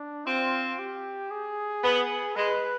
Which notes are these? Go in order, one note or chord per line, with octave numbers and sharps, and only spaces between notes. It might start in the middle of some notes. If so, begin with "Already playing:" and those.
Already playing: D4
C4 F4
G4
G#4
B3
G#3 B4